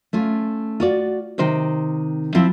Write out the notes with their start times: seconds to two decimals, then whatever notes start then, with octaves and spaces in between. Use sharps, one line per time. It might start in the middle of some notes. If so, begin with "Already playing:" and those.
0.13 A3 C#4 F4
0.80 F4 F#4 D5
1.38 C3 D#3 C5 G5
2.35 F3 C4 E4 F4